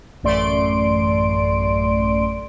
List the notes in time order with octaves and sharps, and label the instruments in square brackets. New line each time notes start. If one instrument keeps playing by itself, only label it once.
[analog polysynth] A1 F#2 A3 D5 C6 D7